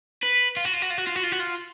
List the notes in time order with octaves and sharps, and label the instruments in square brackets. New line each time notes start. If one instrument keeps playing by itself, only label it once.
[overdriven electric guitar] B4
F4
F#4
F4
F#4
F4
F#4
F4
F#4
F4
F#4
F4